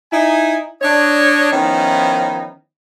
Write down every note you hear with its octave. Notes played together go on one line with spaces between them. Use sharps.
D#4 E4 G#5
D4 C#5 D#5
D#3 F3 B3 C#4 D#4 E4